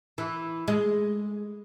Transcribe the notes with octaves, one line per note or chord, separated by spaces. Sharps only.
E3
G#3